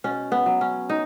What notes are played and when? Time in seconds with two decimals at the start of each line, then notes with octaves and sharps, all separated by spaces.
0.04 B2 C#4
0.32 B3
0.46 F#3
0.61 C#4
0.89 D#4